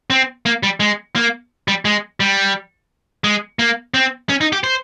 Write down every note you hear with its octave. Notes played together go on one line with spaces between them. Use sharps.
C4
A#3
G3
G#3
A#3
G3
G#3
G3
G#3
A#3
C4
C#4
D#4
G4
C5